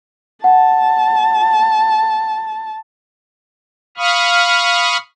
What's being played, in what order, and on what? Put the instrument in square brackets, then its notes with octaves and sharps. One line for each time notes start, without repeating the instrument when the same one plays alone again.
[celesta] F#5 [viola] A5
[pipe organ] F5 B5 C#6 D#6 F6